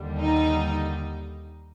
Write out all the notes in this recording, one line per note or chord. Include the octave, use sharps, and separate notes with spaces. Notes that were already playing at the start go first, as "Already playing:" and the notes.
Already playing: D#2 D3 G3
D#4